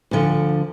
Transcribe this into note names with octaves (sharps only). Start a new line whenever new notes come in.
D2 D3 F3